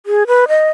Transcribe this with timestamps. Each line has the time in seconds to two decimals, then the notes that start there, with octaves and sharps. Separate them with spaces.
0.06 G#4
0.27 B4
0.48 D#5